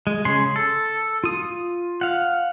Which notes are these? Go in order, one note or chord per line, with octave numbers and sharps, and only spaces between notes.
G#3
C#3 G#4 C#5 C6
A4
F4 D#6
F5 F#5